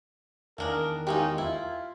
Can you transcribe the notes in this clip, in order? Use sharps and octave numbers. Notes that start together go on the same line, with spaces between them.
E2 D#3 A#3 D4 G#4 A#4
G#3 C#4 D#4 F4 G4
E4 F4